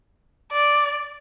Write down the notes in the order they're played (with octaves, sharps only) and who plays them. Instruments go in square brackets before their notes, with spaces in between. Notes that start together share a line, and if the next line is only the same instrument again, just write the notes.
[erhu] D5